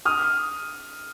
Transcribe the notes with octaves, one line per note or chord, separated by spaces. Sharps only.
D#6 F6